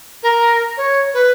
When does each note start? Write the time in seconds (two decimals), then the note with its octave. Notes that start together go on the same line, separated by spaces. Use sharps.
0.22 A#4
0.77 C#5
1.14 B4